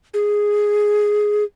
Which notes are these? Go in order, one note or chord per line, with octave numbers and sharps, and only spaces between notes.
G#4